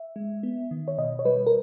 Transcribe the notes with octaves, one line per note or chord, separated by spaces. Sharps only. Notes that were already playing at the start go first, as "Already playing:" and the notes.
Already playing: E5
G#3
B3
D#3
C#5
B2 D#5
C#5
G3 B4
A#4